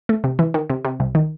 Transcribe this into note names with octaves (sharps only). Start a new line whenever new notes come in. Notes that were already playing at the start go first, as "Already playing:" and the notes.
A3
C3
E3
D#3
C3
C3
C2
D#3